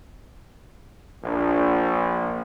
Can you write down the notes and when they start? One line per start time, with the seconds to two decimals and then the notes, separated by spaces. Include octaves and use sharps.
1.23 A#1